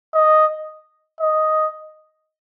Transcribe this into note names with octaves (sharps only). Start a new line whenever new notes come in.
D#5
D#5